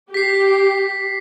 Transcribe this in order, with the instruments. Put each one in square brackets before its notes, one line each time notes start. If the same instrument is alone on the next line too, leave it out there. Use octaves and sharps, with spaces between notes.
[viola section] G4 [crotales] B6 C7